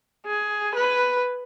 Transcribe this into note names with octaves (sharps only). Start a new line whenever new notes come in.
G#4
B4